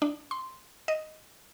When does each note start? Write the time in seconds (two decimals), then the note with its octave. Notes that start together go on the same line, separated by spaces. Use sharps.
0.02 D4
0.31 C6
0.88 D#5